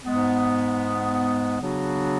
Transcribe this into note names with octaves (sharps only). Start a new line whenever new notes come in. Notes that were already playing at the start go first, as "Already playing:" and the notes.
G#2 G#3 B3
C#3 F#3 B3 D4 F#4